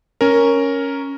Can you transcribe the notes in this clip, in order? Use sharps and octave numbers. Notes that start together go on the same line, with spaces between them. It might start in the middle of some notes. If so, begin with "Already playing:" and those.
C#4 A#4